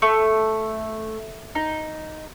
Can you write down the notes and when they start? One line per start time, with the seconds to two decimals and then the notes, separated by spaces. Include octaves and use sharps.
0.02 A3
1.55 D#4